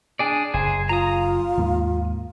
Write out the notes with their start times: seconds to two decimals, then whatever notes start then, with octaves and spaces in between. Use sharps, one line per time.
0.19 D4 G#4 D5
0.54 F#1 G#4 C5
0.89 F4 A#5 D#6
1.57 D#2 G#2 A#3